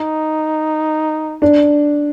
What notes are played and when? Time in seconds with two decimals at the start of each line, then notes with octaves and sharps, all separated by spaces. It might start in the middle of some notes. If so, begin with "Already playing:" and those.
Already playing: D#4
1.42 D4